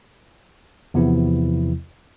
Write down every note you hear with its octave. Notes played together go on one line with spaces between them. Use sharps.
E2 C3 F3 B3 E4